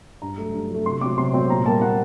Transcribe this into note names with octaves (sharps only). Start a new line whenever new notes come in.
G2 A#5
F#3 A3
G2
F#3 A3
C3 C6
F#3 C4 D6
C3 C6
F#3 C4
A#2 A#5
G3 A#3 A5
A#2 F#5